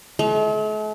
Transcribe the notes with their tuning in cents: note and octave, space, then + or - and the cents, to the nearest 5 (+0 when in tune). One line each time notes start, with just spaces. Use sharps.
A3 -45